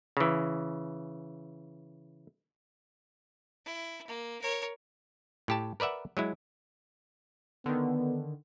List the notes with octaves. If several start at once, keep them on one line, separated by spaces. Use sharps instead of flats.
C#3 E3
E4
A#3
A#4 C#5
A2 G4 A5
A#4 B4 D5 E5 F#5
F#3 G#3 E4
D3 D#3 B3